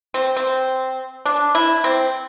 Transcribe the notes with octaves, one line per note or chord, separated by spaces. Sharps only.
C4
C4
D4
E4
C4